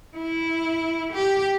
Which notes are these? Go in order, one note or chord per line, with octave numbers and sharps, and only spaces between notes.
E4
G4